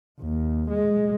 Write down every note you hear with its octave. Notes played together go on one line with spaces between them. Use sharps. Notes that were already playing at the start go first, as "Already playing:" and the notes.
D#2
G#3